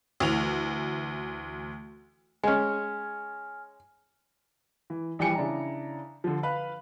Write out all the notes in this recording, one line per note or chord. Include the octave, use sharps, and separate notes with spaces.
D2 E3 F7
G#3 C#4 G#5 F6
E3
A#1 E3 G3 G5 G#5 C#7
C#3 D4 E4 A#5
D3 F3
B4 F5 B5 F#6